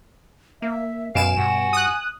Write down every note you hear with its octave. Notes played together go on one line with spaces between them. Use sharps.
A#3 E5
F#2 B2 F5 G#5 D7 E7
G2 F#4
D#6 F#6